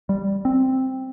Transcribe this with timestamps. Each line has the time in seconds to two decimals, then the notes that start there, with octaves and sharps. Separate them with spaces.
0.09 G3
0.45 C4